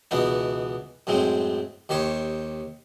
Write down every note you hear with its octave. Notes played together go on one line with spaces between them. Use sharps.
C#2 B2 E3 B3 D#4
F#2 A2 G#3 C4
D#2 D#3 G4 C5 C#5